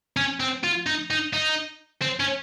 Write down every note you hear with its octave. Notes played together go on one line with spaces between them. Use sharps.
C#4
C4
F4
D#4
D#4
D#4
C4
C#4